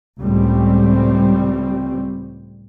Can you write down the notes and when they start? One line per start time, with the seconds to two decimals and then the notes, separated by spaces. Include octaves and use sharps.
0.19 C#2 A2 G3 C4